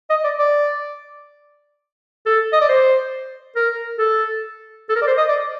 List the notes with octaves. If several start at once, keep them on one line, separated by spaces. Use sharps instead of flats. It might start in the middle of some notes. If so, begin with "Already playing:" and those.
D#5
D5
D5
A4
D#5
D5
C5
A#4
A4
A4
A#4
D5
C5
D#5
D5